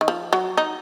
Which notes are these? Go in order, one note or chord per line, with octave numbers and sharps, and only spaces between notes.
D#3
F3
F#3
D#4